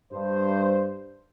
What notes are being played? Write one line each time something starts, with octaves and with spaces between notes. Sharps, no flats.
G2 C5